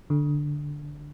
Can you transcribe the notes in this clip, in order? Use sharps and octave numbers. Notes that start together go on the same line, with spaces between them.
D3